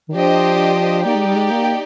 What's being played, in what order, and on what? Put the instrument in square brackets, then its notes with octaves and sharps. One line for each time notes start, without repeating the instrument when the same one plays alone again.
[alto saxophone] D#3
[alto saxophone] F3 [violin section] D4 G4 C5 D#5
[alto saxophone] A#3 [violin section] D#4 G4 D5 G5
[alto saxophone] G#3
G3
G#3
A#3